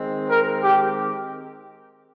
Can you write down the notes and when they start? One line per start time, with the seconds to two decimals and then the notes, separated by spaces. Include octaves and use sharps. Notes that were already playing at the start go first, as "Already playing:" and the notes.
Already playing: D#3 G#3 C4
0.29 A#4
0.63 G4